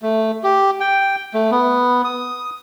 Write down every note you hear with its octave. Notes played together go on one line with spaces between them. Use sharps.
A3
G4
G5
A3
B3
D#6